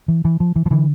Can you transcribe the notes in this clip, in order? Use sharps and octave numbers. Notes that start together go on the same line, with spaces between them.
E3
E3
F3
E3
F3
D3 E3